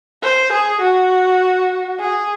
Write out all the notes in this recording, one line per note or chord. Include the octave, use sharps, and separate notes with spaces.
C5
G#4
F#4
G#4